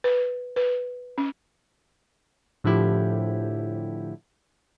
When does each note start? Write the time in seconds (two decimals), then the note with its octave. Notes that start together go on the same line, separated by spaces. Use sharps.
0.04 B4
0.56 B4
1.18 C#4
2.64 A2 D3 F3 E4 G4